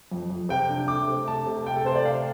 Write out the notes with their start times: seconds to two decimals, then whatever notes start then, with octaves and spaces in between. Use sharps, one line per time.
0.11 F2
0.30 F2
0.49 C3 G5
0.69 D4
0.88 A3 D6
1.08 C3
1.28 A3 A5
1.47 C3
1.67 A3 G5
1.76 A4
1.85 C3 C5
1.95 D5
2.04 A3 F5